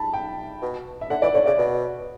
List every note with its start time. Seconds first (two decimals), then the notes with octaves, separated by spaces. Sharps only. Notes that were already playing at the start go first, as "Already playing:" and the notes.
Already playing: A5 B5
0.13 G5
0.62 B2
1.01 E5
1.10 D3 F#5
1.22 E3 D5
1.34 D3 C#5
1.46 C#3 D5
1.58 B2